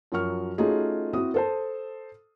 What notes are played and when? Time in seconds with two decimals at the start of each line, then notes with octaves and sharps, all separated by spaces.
0.12 F#2 F3 F#3 F#4 C#6 F6
0.58 A3 C#4 D#4 F4 F#4 G#4
1.13 C4 E4 F#4 D#6
1.34 A4 C5 A5